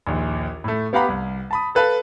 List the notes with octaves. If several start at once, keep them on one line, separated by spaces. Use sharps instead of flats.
A#1 D#2
A2 A3
B3 G4 F5 F#5 A#5 B5
C2
A5 B5 D#6
A4 B4 F5 A5